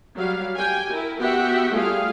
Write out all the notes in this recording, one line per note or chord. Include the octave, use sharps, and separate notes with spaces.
F#3 G3 F5
G4 G5 G#5
E4 A#4
B3 F#4 G4 E5 F#5 G5
G3 A3 F4 G#4 F5